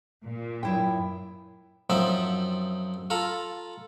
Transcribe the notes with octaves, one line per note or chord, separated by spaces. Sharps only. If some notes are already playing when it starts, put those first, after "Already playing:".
A#2
F#2 E4 G5
F#2 F3 C4 D#4 E5 G5
F4 A4 A#5 B5